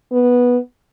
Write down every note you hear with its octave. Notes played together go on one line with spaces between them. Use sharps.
B3